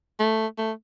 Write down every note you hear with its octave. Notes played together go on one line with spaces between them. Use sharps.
A3
A3